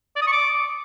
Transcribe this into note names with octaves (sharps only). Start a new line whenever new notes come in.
D5
D#6
C#6
D6